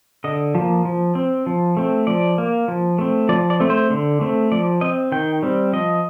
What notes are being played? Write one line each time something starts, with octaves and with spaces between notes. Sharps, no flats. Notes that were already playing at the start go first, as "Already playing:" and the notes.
D3 D#5
F3 A#3
F3
C4
F3
A3 C4
F3 D5
A#3
F3
A3 C4
F3 D5
D5
A3 C4
C5
D3
A3 C4
F3 D5
C4 D#5
D#3 G5
G3 C4
F3 D#5